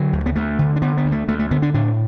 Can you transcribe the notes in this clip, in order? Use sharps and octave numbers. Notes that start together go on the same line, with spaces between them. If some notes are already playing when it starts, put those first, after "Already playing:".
Already playing: D3 F#3
D2
B3
D2 A3
D3
D4
D3 B3
B3
D2
A3
D2 A3
A3
D3 B3
D4
A2 D4